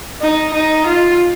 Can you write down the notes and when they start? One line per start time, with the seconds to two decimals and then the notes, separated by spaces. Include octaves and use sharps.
0.21 D#4
0.54 D#4
0.86 F4